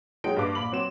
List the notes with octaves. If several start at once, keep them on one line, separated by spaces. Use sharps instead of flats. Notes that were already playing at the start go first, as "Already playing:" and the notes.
F#3 G#3 D#4 G5 D7
G2 A#3 B4 F5 D6
A#1 B5 F#7
F#3 C4 E7